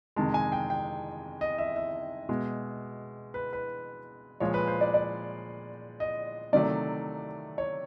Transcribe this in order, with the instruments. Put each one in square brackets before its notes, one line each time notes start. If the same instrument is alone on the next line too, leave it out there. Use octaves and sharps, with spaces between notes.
[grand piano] F2 C3 D#3 G#3 A5
G#5
G5
G5
D#5
E5
E5
B2 G#3
B4
B4
A#2 F3 G#3 C#5
B4
C5
D5
D5
D#5
C3 D#3 F#3 A3 D5
C#5